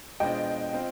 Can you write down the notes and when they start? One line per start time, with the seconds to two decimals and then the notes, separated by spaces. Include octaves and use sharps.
0.20 B2 G#3 D4 F4 C5 D#5 G5
0.73 C4 F4 C5